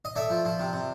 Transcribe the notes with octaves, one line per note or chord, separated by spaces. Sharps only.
D#5
A3 D5 E5
F3
F3
C3
C3